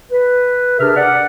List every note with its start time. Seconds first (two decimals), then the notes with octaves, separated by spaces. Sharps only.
0.11 B4
0.79 C3 D4 G#4 A#4 E5 F6
0.96 D5 F#5